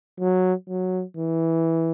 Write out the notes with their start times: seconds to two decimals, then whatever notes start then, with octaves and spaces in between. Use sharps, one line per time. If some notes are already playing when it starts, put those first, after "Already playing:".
0.20 F#3
0.69 F#3
1.17 E3